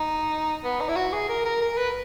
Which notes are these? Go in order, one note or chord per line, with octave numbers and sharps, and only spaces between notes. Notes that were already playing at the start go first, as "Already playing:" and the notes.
Already playing: D#4
B3
D#4
E4
F#4
G#4
A#4
A#4
A#4
B4